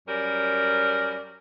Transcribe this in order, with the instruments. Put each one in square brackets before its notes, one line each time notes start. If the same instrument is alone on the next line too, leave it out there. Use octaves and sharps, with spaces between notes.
[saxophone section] F#2 G3 C#4 A#4